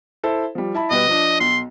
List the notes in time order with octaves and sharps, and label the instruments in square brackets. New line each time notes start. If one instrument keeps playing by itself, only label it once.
[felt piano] E4 A4 C5
F3 G3
E4 A5 B5
[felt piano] B2 G3 B4 [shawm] D#5
[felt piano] F3 D4
[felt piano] B1 [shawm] C6